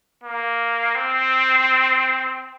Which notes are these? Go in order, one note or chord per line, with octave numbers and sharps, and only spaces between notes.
A#3
C4